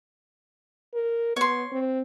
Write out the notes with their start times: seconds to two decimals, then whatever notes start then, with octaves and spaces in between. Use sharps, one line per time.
0.94 A#4
1.36 B3 C#5 C6
1.72 C4